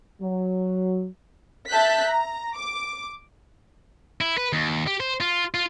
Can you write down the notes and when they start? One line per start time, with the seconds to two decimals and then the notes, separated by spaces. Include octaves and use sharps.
0.22 F#3
1.70 E5 A5 F#6 G6 B6
2.06 A#5
2.55 D6
4.21 E4
4.38 B4
4.53 D#2
4.87 G4
5.00 C5
5.20 F4
5.54 F4